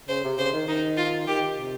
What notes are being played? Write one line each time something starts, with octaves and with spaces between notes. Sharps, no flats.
C#3 C5
C3
C#3 C5
D#3
D#3 D#4
F4
D#3 G4
C3